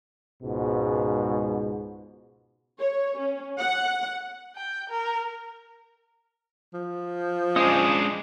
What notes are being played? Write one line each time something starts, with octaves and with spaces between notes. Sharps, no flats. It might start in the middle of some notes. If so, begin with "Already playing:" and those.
C#2 G#2 B2
C#5
C#4
F#5
G5
A#4
F3
G#3 C#4 D4 D#5 D#6